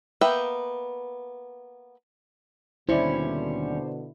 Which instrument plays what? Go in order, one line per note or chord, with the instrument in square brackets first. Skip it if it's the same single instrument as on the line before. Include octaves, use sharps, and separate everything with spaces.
[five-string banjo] A#3 B3 B4 E5 G5
[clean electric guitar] D#2 G3 C#4 [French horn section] B2 D3 [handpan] E4 [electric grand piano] C5 D5